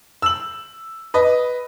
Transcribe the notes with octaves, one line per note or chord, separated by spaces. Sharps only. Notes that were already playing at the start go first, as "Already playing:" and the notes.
E6 F#7
B4 D#5